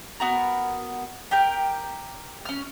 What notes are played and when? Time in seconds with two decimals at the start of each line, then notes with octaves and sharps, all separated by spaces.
0.20 B3 F#4 A#4
1.31 G4 A#4 G5
2.45 C#4 F6